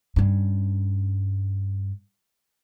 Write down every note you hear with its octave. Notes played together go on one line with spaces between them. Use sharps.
G2 C#4